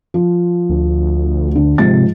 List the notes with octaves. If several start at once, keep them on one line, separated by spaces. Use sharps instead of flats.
F3
D2
D3
G#2 C3 F3 A6